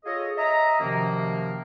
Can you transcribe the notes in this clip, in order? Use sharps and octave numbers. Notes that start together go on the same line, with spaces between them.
F4 G#4 A4 C#5 D#5
D#5 E5 A#5
F#2 C3 D#3 F3 A#3